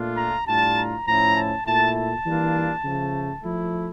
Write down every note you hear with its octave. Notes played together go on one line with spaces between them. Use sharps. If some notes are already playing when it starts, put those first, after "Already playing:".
Already playing: A#2 A3 D4 F4
A#5
A2 G3 D4 F4 A5
A#5
A2 F3 C#4 E4 A#5
A5
A#2 A3 E4 A5
A5
E3 G3 A#3 D4 F4
C#3 F3 A3
F3 A3 E4